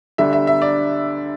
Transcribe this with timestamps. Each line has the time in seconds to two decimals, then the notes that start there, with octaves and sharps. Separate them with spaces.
0.18 D2 D3 G3 E5
0.33 E5
0.47 E5
0.62 D5